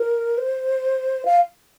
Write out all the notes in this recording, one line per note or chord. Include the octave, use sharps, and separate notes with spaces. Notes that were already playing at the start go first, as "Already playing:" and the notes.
Already playing: A#4
C5
F5